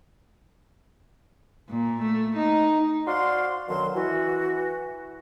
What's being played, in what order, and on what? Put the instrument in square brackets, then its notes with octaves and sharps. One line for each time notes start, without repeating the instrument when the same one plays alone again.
[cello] A#2
A3
D#4
[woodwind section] F#4 C5 D5 F5 C6
F#2 B2 D3 D#3 F#3 C6
E3 F#4